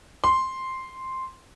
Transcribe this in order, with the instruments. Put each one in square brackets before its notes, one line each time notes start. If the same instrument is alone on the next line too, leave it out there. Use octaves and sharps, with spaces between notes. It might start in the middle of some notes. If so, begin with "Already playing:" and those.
[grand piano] C6